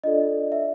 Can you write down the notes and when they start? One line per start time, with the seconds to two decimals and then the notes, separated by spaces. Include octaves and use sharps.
0.04 D4 F4 A4 D5 D#5
0.52 E5